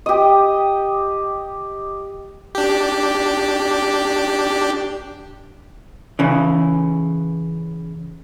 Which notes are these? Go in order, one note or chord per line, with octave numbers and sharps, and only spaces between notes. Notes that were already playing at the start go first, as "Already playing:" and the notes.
G4 D#5
D4 G4
C#3 E3